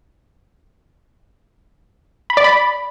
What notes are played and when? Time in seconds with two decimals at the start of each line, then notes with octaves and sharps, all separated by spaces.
2.30 B5
2.37 D5
2.44 B5